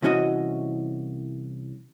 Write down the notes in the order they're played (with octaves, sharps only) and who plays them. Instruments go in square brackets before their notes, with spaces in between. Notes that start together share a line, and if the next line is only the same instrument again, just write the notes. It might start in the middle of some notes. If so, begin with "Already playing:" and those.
[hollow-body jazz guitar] C2 E3 C#4 F#4 D#5